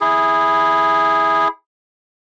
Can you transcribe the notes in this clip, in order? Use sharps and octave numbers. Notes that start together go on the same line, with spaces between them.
E4 G#4